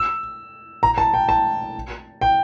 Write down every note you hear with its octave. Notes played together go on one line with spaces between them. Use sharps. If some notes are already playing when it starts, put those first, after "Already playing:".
Already playing: E6
A#5
A5
G5
A5
G5